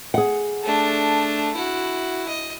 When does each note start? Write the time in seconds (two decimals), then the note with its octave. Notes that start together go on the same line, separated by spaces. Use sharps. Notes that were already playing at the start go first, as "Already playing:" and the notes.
0.14 G#4 F#5
0.63 A3 D4
1.54 E4 F#4
2.28 D#5